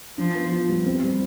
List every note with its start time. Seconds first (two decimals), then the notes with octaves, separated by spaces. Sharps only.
0.18 F3 D4
0.35 B3
0.52 F4
0.69 G3
0.86 C4
1.03 G3